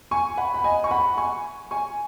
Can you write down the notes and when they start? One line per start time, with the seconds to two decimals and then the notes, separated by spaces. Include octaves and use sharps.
0.11 G#5 C#6
0.38 F#5 B5
0.54 B5
0.64 D#5 G#5
0.84 C#6
0.91 F#5 B5
1.17 G#5 C#6
1.71 G#5 C#6